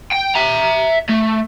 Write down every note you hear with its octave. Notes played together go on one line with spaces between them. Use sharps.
G5
E5 A#5
A3